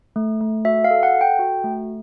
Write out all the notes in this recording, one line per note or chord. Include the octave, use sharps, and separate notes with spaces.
A3
A3
F#4 E5
F5
A4
F#5
A4
G5
F#4
A3